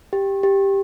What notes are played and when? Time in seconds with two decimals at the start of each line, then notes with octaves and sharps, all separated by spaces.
0.13 G4
0.43 G4